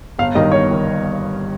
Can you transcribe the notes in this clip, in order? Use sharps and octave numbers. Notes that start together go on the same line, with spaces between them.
G1 F5
G2 D#3 D#5
G1 C#5
D#3